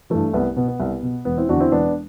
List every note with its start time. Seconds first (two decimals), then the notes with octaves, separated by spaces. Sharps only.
0.10 G2 E3 A3
0.33 C2 B3
0.56 B2 B3
0.68 B3
0.80 C2
1.03 B2
1.25 E1 B3
1.37 C4 E4
1.49 E2 D3 D4 F#4
1.60 C4 E4
1.72 E1 B3 D4